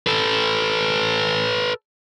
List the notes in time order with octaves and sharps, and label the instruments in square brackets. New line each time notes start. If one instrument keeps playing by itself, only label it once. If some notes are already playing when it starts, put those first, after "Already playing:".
[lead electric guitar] A4 B4